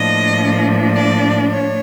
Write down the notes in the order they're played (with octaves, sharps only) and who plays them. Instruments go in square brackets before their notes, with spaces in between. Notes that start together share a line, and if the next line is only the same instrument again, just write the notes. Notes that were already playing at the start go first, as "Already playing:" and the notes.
Already playing: [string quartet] A2 F3 A#3 D4 D#5
D5
C#5